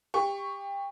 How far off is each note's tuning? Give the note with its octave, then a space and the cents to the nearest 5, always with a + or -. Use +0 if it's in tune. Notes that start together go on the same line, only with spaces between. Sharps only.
G4 +25 C#6 +0